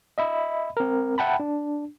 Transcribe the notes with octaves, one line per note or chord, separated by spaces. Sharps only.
D#5 E5 B5
C4 A#4
E5 F#5 G5 A5 B5
D4